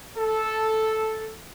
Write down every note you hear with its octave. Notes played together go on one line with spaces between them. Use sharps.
A4